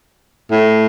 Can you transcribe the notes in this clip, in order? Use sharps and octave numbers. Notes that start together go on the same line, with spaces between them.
A2